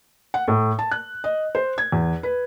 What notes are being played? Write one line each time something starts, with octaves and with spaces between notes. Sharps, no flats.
F#5
A2
A5
F#6
D#5
C5
G#6
E2
B4